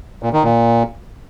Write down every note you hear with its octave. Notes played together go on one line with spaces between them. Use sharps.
A#2
D#3
A#2